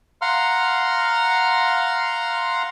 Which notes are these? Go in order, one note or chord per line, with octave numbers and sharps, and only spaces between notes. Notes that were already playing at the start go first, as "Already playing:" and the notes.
F5 F#5 A#5 C6 F6